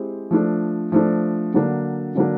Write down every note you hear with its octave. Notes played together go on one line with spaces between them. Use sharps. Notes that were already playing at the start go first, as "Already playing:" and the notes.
Already playing: G#3 C4 E4 G4
F3 A3 D4
F3 A3 D4
D3 F#3 A#3 D4
D3 F#3 A#3 D4